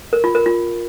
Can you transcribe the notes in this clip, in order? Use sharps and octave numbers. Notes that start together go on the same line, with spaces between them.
A#4
F4
A#4
F4